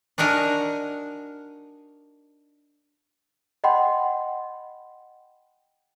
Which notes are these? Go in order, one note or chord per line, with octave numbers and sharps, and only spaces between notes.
D4 D#4 F#4 A#4 G#5
D#5 F#5 G5 B5 C6